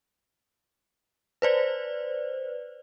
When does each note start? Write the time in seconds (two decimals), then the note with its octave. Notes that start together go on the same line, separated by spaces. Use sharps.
1.42 B4 C5 D5